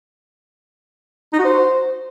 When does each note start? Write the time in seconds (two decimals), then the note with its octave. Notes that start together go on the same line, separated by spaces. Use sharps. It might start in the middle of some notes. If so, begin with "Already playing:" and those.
1.33 D#4
1.39 F#4
1.45 C5